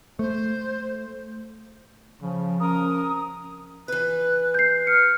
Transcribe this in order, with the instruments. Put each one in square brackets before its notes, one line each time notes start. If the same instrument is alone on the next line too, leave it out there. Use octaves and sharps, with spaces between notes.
[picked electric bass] A3 [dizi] C5
[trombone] C#3 [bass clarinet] F3
[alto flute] C#4 [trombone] A#4 [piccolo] D#6
[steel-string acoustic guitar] E3 B4 [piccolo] F#6
[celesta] G6 C7
[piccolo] F6 [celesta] C#7